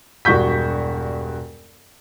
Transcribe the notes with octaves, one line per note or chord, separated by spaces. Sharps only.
E1 G2 F#4 C#6 G6 B6